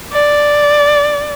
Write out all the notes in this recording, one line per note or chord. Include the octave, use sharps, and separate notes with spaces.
D5